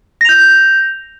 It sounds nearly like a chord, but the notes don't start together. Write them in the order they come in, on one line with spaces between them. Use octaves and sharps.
A#6 F7 G6